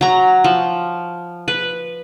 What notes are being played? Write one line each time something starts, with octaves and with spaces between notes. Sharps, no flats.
F#3 A#5
F3
B4